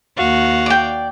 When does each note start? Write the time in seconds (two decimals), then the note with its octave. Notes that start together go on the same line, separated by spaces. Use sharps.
0.17 D#2 F#4 F5
0.66 D5 G5